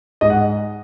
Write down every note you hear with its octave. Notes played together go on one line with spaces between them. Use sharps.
G#2 G#3 D#5
F#5